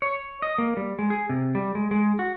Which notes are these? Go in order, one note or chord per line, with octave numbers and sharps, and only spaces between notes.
C#5
D#5
A#3
G3
G#3
G#4
C3
G3
G#3
G#3
F#4